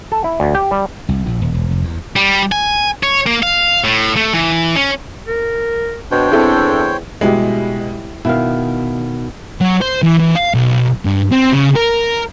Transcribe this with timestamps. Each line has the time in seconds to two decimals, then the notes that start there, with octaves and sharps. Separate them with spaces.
0.12 A4
0.24 E4
0.40 D2
0.55 G4
0.71 G3
1.09 C2
1.26 A#1
1.42 D#1
1.54 E1
1.71 F1
1.84 E2
2.16 G3
2.52 G#5
3.03 C#5
3.26 A#3
3.43 F5
3.84 A2
4.16 A3
4.33 E3
4.76 C#4
5.27 A#4
6.11 B2 D4 C5 C#5 G5
6.32 E2 C4 E4 A4
7.21 B2 G3 G#3 E4 G4
8.25 B2 D#3 E4 F5
9.61 F#3
9.81 C5
10.02 E3
10.19 E3
10.35 F5
10.54 B1
11.05 G2
11.32 C4
11.53 C#3
11.76 A#4